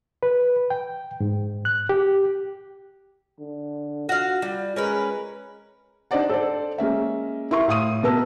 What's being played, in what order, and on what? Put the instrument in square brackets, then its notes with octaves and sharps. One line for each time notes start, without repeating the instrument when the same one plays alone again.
[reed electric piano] B4
G5
G#2
F#6
G4
[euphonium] D3
[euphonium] F4 [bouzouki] F#4 F5
[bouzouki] G3
[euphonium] G#3 [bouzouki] C#4 A#4 B4
[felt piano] D4 D#4 C5 D5 F#5
A4 C5 D5
G#3 A#3 C#4 E5
E4 A#4 C6 C#6
A2 F5 D#6 D#7
B2 B3 A#4 B4 A5 E6